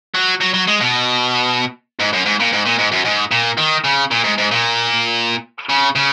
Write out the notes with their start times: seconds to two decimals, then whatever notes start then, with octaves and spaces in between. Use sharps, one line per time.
0.15 F#3
0.41 F#3
0.54 F#3
0.68 G#3
0.81 B2
2.00 G#2
2.13 F#2
2.26 G#2
2.40 A#2
2.52 G#2
2.66 A#2
2.78 G#2
2.92 F#2
3.05 G#2
3.31 A#2
3.58 D#3
3.84 C#3
4.11 A#2
4.24 G#2
4.38 G#2
4.51 A#2
5.69 C#3
5.96 C#3